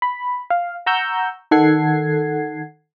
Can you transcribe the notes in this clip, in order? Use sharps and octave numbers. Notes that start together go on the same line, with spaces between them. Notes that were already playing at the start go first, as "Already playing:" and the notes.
B5
F5
F#5 A#5 C#6 E6 G6
D#3 A4 F#5 G#6 C7